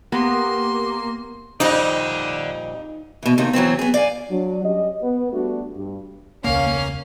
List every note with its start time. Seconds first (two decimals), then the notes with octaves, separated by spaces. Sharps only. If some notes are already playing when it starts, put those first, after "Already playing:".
0.12 A#3 B3 G4 C6
1.60 F2 A#2 G3 D#4 D5 F#5
3.23 B2 E3
3.38 D#2 C3 D#3
3.53 E3 F#3 B3 C4
3.79 B3 G#4
3.94 D5 F5 G#5
4.31 F#3 D4
4.65 G3 C#4 G4 D#5
5.02 B3
5.33 G3 A3 B3 D4 F#4
5.76 G2
6.44 E1 C#2 A#3 C#4 F5